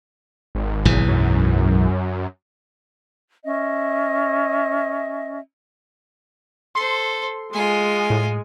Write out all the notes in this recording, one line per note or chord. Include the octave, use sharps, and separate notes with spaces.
G#1
B1 G#2 E3
F#2
C#4 D#5 E5
A4 C5 C6
G#3 F4 G#5
A2